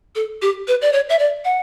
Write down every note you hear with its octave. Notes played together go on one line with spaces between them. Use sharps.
A4
G4
B4
D5
C#5
E5
D5
F#5